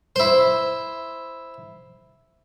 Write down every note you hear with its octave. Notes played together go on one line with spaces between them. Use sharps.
E4 C5